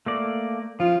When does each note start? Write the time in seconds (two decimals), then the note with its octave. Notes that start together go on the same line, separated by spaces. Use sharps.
0.06 A3 A#3 D5
0.80 F3 F4